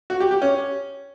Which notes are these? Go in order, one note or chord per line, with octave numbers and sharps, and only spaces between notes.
F#4
G4
G4
C#4